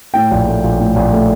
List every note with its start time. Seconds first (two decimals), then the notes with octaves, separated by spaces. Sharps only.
0.14 A2 G5
0.31 A#1
0.48 A3
0.64 A#1
0.80 A2
0.96 A#1
1.13 A3